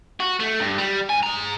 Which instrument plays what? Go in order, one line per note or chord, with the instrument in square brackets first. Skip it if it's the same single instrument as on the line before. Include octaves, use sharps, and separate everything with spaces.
[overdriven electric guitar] F#4
A3
G2
G3
G2 G#5
G#4 A#5